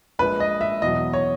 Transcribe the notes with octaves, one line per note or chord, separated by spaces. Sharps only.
A#1 A#2 G#3 B4
D#5
E5
E2 B2 F#3 D#5
C#5